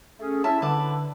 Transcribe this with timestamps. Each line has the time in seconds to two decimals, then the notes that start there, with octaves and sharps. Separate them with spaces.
0.20 A3 C#4 G#4
0.44 C#4 E4 E5 A5
0.62 D3 B4 A5 D6